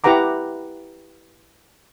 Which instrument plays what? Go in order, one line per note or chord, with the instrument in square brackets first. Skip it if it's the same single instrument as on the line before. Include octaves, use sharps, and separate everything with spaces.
[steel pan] E4 G4 B4 F#5 A#5 D6